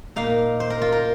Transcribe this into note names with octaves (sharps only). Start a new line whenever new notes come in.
A#2 A#3 D#4 F5
C5
A#4
F4
A#4